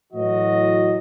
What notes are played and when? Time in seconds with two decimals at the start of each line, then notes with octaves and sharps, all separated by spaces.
0.13 A2 E3 F#3 F#4 D#5